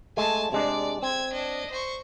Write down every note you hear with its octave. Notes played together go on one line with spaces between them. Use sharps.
G#3 A3 G#5 A5
C3 G#3 D4 D5
C4 E6 G#6
D4 D#5
C5 C#6